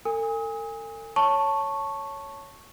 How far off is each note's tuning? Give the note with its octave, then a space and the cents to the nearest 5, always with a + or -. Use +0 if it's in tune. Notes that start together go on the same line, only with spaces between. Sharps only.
A4 +40 G#5 -25 D#6 +35
C#5 +0 A5 +0 C#6 -5